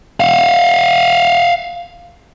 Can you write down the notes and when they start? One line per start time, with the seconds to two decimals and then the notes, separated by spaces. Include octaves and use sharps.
0.20 F5 F#5